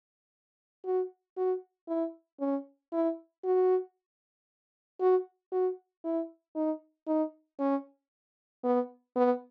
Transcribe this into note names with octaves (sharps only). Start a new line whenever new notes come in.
F#4
F#4
E4
C#4
E4
F#4
F#4
F#4
E4
D#4
D#4
C#4
B3
B3